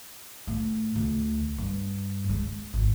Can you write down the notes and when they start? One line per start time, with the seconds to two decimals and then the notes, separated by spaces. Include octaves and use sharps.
0.47 A2
0.96 D2
1.58 G2
2.29 G#3
2.74 G#1